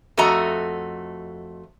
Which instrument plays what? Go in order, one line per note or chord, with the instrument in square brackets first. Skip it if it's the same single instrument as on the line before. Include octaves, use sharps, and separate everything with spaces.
[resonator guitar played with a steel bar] F2 A3 F#4 D#5 A#5